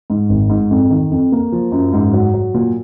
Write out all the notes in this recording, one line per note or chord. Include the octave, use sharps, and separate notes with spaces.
G#2
G#1
G#2
F2
D#3
F2
A#3
F3
F#2
G#2
F#3
F#3
A#2